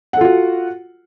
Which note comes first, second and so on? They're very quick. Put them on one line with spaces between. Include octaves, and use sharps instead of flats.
F#5 A4 F4 F#4